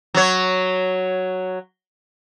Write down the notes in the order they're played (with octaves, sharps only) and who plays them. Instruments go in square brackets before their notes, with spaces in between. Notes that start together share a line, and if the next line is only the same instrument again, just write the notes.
[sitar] F#3 C#5